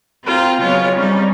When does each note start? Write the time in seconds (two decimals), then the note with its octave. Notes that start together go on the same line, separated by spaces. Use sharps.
0.25 C4 F4 G5 A#5
0.59 C#3 F#3 G#3 B3 F4 C#5
0.96 G3 C4 C#4 D#4